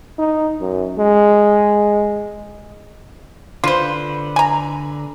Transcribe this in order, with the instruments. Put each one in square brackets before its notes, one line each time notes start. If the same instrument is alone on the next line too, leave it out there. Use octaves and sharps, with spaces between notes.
[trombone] D#4
F#2
G#3
[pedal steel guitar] D3 B4 [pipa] F4 C5
[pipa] G#5 A#5